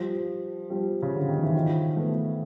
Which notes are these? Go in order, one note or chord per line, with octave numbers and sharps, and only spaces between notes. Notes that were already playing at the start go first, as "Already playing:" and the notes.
Already playing: F3 G3
F3 G3
C#3
D3
D#3
E3
D#3 F3
A3 B3